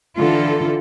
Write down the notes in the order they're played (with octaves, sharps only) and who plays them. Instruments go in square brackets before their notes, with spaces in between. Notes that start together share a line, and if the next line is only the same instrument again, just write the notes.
[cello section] D3 E3 F4 A4